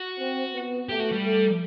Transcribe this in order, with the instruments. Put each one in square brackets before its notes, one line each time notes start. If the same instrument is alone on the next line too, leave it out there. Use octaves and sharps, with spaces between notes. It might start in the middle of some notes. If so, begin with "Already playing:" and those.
Already playing: [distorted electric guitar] F#4
[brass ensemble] C4
B3
[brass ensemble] A3 [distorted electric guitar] G4
[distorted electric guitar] F#4
G3
[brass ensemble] A3